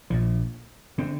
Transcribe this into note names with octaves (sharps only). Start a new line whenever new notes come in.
A#1 A#2 F3
D3 C4